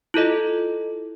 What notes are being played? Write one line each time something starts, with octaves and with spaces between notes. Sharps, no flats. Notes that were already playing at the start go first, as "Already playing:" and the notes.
E4 F4 A4 D#5